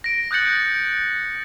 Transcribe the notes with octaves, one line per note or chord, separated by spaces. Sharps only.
A#6 D7
D#6 F#6 G6 A6 C#7 F#7